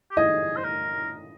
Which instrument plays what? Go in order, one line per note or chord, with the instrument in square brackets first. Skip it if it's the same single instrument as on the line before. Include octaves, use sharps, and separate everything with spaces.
[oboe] G4
[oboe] G#4 [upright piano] D#5
[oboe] C5
A#4